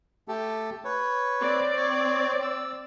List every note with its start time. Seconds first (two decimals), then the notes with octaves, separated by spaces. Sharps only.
0.28 A3 G4 A4
0.84 B4 C#5
1.41 C4 D5
1.77 C#5
2.42 E6